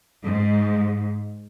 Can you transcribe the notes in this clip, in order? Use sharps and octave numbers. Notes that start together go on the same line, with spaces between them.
G#2